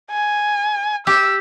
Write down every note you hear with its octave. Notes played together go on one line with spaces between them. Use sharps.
G#5
G4 E6